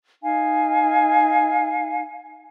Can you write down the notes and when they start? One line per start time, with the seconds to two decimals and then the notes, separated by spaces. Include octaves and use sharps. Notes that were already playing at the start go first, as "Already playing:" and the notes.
0.23 D#4 F5 G#5